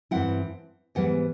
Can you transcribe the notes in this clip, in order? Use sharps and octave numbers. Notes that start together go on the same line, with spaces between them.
G2 E3 G#3 C4 E4 F#5
G#2 E3 G3 B3 F#5